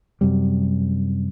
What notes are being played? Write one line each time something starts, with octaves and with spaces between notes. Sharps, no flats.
F#2 C3 G3